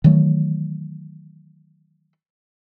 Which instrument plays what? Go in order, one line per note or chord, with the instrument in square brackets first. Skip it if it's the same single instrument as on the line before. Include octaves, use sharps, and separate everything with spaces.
[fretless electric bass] D#3 E3 F#3 A3